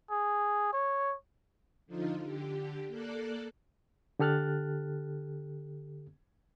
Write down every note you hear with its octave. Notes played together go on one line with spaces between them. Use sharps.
G#4
C#5
D3 F3 D#4 F4
D3 G4
A#3 A4 D5 F#6
D3 G4 A4 F6 F#6 A6